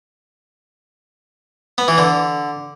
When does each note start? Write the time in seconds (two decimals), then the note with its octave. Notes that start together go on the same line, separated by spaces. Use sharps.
1.78 B3
1.88 E3
1.98 D3